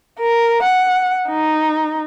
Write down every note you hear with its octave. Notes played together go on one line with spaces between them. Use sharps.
A#4
F#5
D#4